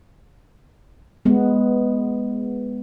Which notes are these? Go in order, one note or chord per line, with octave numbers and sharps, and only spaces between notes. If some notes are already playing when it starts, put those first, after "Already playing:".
G#3 B3